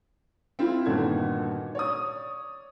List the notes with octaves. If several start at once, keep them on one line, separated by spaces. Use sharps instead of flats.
C4 E4 F4
G1 A#2 D#3 F#4 A4 G#6
C#5 D5 D#6